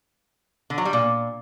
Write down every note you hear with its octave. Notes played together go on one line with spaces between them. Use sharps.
D3
F#3
G3
A#2